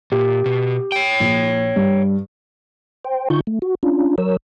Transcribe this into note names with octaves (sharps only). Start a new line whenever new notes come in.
A#2 G4
B2
C#5 G5
A#1
G2
C5 G5
D3 D#4 F4 C#6 G6
A3
F#4
C#4 D4 F4
F#3 A#4 C#5 E6